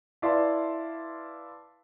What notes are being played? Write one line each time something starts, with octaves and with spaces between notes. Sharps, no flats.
E4 B4 D5 F5 A5 C6